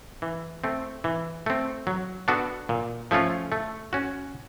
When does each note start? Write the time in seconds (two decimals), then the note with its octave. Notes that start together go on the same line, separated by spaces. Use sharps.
0.22 E3
0.64 A3 C4
1.04 E3
1.46 A3 C4
1.87 F#3
2.28 B3 D4 F#4 A4
2.69 A#2
3.11 F3 A3 C#4 F4
3.52 A3
3.93 C#4 F#4